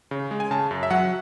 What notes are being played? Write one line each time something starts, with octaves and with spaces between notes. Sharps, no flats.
C#3
G#3
G#5
C#3 A5
F#2
E5
F#3 F#5